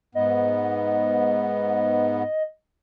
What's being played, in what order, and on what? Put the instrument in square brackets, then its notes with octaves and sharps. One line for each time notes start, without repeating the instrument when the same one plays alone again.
[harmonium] G#2 B3 [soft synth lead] D#5